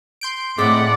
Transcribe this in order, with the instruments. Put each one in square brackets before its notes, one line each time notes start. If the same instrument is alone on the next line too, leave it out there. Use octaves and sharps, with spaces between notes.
[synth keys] C6 G6 D7
[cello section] A2 [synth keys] G#3 C4 B6 [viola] D5 F#5 [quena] D6